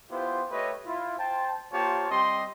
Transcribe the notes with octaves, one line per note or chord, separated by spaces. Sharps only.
B3 E4 F4 G4 C5
A3 G4 B4 C#5 D#5 E5
E4 F4
C5 G5 A5
A#3 F4 G4 C5 C#5 A5
G3 C4 G4 D#5 C6